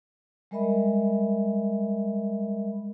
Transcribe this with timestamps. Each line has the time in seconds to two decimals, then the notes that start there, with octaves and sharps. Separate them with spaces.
0.51 G3 G#3 A#4 D#5 E5 B5